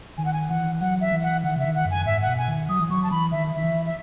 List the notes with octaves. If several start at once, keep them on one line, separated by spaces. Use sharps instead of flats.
D#3 G#5
F#5
G#5
E3 F#5
F#3 F#5
E5
E3
F#5
D#3 F#5
C#3
E5
D#3
F#5
F#2
G#5
G#2 E5
B2 F#5
G#5
D#3
F#3 D#6
E3
F#3 C#6
A5
E3 B5
D#3 E5
D#3 E5
E3
E5